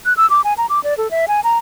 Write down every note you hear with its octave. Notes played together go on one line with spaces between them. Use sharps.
F#6
E6
D6
G#5
A#5
D6
D5
A4
E5
G#5
A#5